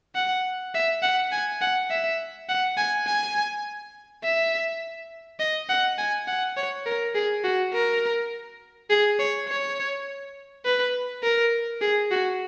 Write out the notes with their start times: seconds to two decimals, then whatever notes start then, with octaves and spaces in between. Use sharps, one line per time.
0.15 F#5
0.74 E5
1.02 F#5
1.32 G#5
1.61 F#5
1.90 E5
2.49 F#5
2.77 G#5
3.07 G#5
4.23 E5
5.39 D#5
5.69 F#5
5.98 G#5
6.27 F#5
6.57 C#5
6.86 A#4
7.15 G#4
7.44 F#4
7.73 A#4
8.90 G#4
9.19 C#5
9.48 C#5
10.65 B4
11.23 A#4
11.81 G#4
12.11 F#4